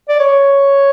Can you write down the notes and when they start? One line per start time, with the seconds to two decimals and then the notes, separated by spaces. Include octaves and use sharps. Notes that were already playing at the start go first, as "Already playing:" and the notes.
0.09 D5
0.19 C#5